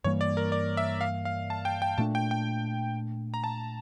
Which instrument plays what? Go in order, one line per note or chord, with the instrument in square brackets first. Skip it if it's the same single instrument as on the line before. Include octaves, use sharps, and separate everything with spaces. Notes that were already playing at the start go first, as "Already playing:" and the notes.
[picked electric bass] G2 E3 G3 A#3 [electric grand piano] C#5
[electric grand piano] D5
A#4
D5
E5
F5
F5
A5
G5
G5
[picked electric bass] A#2 A3 D4 [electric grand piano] A5
[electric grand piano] G5
G5
A#5
A5